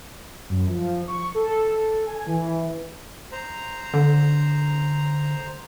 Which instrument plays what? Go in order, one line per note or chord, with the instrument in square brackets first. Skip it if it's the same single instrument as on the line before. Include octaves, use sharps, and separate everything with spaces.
[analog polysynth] F#2
F3
C#6
A4
G#5
E3
[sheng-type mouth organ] C5 A#5
[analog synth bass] D3